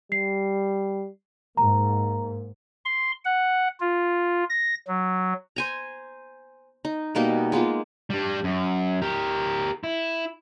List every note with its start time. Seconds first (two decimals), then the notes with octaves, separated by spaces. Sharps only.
0.12 G3 C7
1.57 G#2 A#3 A#5
2.85 C6
3.25 F#5
3.80 F4
4.49 A#6
4.87 F#3
5.56 C5 G#5 A#5
6.85 D#4
7.15 B2 G3 A#3 D#4
7.52 G#3 A#3 B3 F4
8.10 G3 D4
8.44 F#2
9.02 G4 A#4
9.84 E4